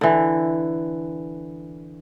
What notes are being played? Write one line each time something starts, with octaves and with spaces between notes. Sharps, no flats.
D3 E3